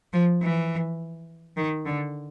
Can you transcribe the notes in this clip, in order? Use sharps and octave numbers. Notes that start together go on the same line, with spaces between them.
F3
E3
D#3
D3